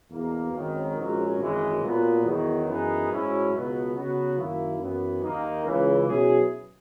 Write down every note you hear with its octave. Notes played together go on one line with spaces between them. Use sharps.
E2 B2 A#3
G#1 F#2 D#3
A#1 G#2 F#3 C#4
G#1 F#2 E3 G#3
A#2 F#3 B3
E2 D#3 F#3
F#2 E3 B3 D#4 G#4
G#2 F#3 C#4 E4
C#2 B2 F#3 B3
C#3 F#3 B3 F#4
F#2 D#3 F#3 A#3 E4
F#2 E3 B3
D#2 D#3 A#3 D#4
C#2 C#3 E3
B2 F#3 C#4 E4 G#4